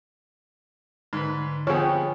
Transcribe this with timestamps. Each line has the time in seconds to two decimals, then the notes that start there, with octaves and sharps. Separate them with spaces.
1.13 G#2 D3 B4
1.67 G1 F3 B3 C4 G#4 C#5 G5